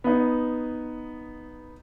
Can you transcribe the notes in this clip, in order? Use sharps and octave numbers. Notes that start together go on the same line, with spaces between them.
B3 D#4